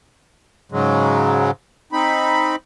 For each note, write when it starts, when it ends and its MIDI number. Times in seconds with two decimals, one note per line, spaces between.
0.72 1.51 44
0.72 1.51 49
0.72 1.51 54
0.72 1.51 56
1.93 2.56 60
1.93 2.56 63
1.93 2.56 83